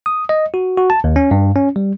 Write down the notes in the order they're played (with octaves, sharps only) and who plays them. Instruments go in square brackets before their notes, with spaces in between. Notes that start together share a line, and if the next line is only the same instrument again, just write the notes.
[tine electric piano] D#6
D#5
F#4
F#4
A5
D#2
C#4
G2
C#4
G3